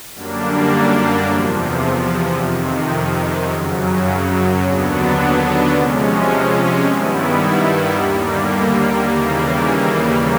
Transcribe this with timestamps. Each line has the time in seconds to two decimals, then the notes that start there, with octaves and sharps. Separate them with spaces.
0.14 F#2 D3 G3 A#3 D4
1.25 E2 C3 F3
2.37 F2 C3 D#3
3.49 F#2 C#3 F#3
4.59 D#2 D3 F#3 B3 D4
5.72 C3 F3 G#3 C#4
6.83 G2 D#3 G3 B3 E4
7.95 D#2 D3 G3 A#3
9.06 D#2 C#3 E3 G3 A#3